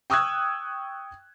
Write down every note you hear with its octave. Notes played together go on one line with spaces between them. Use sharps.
G5 C#6 D#6 E6 F#6 G#6